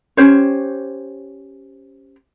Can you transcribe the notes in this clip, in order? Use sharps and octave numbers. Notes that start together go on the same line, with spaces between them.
C#4 G4 C5 C#5